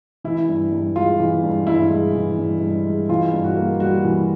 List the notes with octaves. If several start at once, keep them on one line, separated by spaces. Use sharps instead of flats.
E3 E4
G2
G2
G#3 F4
E3
G2
G2 E4
G#3
E3
G2
G2
G#3
E3 F4
G2
F#4
A#3
G3 F#4
E3